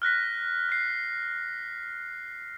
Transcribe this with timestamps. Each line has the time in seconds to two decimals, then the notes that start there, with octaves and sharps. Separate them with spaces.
0.02 F6 F#6 A#6 B6
0.69 F#6 C7